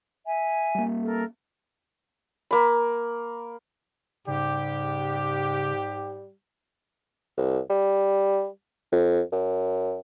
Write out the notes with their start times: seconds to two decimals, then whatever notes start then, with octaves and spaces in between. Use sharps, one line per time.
0.27 E5 G#5
0.75 G3 A#3
1.04 A4 A#4
2.51 A#3 B5
4.27 G#2 C#3 G3 G4
7.37 C2
7.70 G3
8.92 F2
9.32 F#2